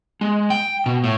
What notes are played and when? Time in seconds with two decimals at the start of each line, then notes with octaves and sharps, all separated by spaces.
0.21 G#3
0.50 G5
0.86 B2
1.04 A2